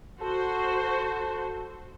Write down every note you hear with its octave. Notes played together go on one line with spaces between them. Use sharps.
F#4 A4 C5